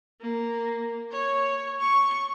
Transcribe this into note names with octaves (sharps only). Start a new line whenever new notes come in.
A#3
C#5
C#6